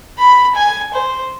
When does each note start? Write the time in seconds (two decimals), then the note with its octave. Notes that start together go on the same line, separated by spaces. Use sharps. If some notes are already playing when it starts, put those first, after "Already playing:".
0.19 B5
0.55 G#5
0.94 C5